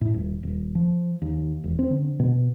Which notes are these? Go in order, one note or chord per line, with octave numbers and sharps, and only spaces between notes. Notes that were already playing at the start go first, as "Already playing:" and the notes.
A2
D#1
D#1
F3
D#2
E1
C4
D3
B2